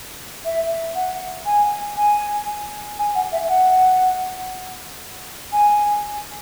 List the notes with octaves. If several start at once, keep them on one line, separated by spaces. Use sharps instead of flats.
E5
F#5
G#5
G#5
G#5
F#5
E5
F#5
G#5